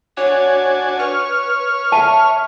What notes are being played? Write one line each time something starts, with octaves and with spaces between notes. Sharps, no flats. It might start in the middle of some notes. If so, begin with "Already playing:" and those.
D4 F#4 C#5 G#5
B4 C#5 F6
E5 A5